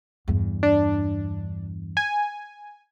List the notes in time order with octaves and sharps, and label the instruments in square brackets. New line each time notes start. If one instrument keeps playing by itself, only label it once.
[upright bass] E2 G2
[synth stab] D4
G#5